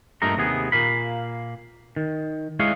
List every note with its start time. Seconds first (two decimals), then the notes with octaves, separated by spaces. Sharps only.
0.22 G2 A#2 A3 A#4 D#5 A#5
0.37 D#2 C3 B3 G#4
0.72 A#2 A#3 F5 B5
1.96 D#3
2.59 G#3 E4 C#5 D#5 F5